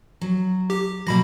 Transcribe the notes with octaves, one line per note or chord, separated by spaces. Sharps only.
F#3
G4
B2 F#3 A#3 B5 A#6